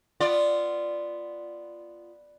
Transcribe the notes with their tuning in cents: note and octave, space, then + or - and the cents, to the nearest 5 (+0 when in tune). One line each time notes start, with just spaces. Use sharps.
B3 +0 F4 -10 D5 +5